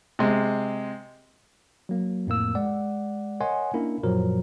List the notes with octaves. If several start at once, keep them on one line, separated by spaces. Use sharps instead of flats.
C3 G#3
F#3 A#3
F2 A2 A#3 E6
G#3 D5 F#5
A#4 C#5 D#5 F#5 G#5 C6
A#3 C#4 D4 E4 A#4
F#2 A#2 F3 F#3 A#4